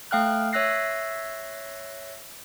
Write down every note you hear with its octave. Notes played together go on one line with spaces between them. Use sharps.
A3 F5 G5 F6 F#6
C#5 E5 E6 F#6 A#6 C7